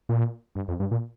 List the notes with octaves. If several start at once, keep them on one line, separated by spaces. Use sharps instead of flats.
A#2
G2
F2
G2
A#2